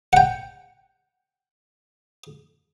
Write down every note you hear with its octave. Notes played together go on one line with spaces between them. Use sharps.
F#5 G5